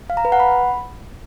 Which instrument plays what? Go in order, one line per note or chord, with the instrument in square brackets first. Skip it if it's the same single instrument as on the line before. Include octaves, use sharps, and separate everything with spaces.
[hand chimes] F5
A#5
B4
F#5
B5